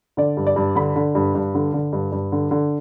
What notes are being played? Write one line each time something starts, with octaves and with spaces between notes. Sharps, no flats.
D3 D5
G2
D5
G2
D3 B5
D3
G2
G2
D3
D3
G2
G2
D3
D3